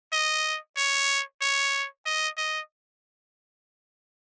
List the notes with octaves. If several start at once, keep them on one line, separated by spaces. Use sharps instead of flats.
D#5
C#5
C#5
D#5
D#5